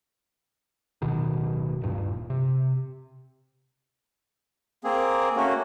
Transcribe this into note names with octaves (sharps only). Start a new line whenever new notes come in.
D1 B2 D#3
D1 G2 A#2
C3
A#3 C4 G#4
A3 A#3 C#4 F#4